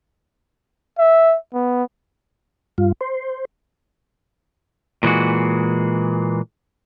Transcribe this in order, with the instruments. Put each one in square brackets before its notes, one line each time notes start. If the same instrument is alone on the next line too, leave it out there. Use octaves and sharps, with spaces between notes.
[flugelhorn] E5
B3
[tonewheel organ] G2 F4
C5
[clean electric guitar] A#2 E3 G#3 F#4